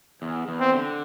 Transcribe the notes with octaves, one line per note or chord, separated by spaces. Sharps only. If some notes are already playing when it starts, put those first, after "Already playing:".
E2
E2
C4
D3